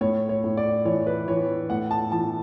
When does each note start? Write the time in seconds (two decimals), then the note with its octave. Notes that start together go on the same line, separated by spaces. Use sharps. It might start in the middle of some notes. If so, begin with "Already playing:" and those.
0.01 A2 C#5
0.29 C#5
0.44 A2
0.57 D5
0.85 E3 C#5
1.07 B4
1.28 E3 C#5
1.70 A2 F#5
1.91 A5
2.12 E3 A5